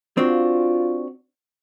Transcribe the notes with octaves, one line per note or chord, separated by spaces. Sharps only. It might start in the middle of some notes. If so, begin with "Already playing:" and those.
C4 D4 F4 F#4